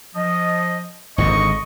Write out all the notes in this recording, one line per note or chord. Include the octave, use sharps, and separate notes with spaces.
F3 D#5
G#1 G#2 D3 D#5 C#6